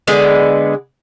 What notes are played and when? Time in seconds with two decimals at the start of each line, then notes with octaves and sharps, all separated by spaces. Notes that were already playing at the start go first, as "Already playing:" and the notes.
0.07 D3 G#3 B3